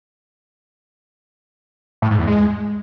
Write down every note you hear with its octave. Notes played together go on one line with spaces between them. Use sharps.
A2
G#2
E2
G#3